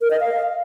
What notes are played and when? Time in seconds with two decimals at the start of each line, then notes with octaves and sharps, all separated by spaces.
0.01 A#4
0.11 D#5
0.20 F5